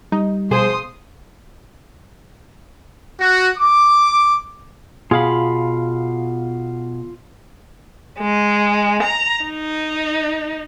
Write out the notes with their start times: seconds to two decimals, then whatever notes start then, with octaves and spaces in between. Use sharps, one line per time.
0.12 G3 D#4
0.51 B2 F3 G#4 C5 C6 D#6
3.20 F#4
3.58 D6
5.11 B2 F4 G#4 F5 B5
8.18 G#3
9.02 A#5
9.44 D#4